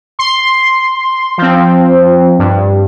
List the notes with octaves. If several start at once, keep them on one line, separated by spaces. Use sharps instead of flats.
C6
F3 C4
G2